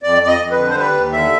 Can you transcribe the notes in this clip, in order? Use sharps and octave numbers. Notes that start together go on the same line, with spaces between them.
F2 D5
F2 D5
D#5
F2
B4
D3
C5
G3 B4
D#2
D3 E5